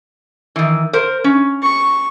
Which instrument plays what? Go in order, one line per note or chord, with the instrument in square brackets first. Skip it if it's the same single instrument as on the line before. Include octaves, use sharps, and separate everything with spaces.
[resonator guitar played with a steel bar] D#3 E3
A#4 C5
C#4
[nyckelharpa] C#6